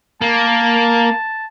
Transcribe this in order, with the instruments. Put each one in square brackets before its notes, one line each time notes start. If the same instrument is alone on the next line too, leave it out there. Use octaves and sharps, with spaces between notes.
[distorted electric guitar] A#3 [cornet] A5